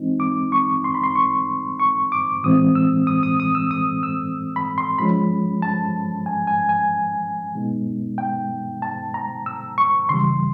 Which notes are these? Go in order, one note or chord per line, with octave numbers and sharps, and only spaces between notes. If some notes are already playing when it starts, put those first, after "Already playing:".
Already playing: E3 G#3 C4 D#4
D6
C#6
C6
B5
C6
C#6
C#6
D6
A2 E3 G#3 C4 D#6
E6
D#6
D#6
D#6
E6
D#6
E6
B5
C6
F3 G#3 C#4 B5
A5
G#5
G#5
G#5
B2 G#3 B3 D#4
G5
A5
A#5
E6
C#6
C#3 E3 G3 C6